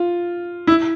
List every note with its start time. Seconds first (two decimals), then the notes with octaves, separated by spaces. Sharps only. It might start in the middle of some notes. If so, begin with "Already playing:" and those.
Already playing: F4
0.67 E4